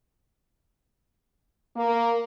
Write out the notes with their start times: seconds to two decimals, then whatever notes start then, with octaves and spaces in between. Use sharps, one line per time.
1.75 A#3